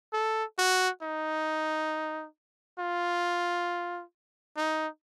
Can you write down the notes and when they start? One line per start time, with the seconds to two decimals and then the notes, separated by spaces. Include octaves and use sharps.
0.13 A4
0.58 F#4
1.03 D#4
2.79 F4
4.57 D#4